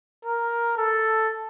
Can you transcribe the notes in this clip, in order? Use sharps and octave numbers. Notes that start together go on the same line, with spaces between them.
A#4
A4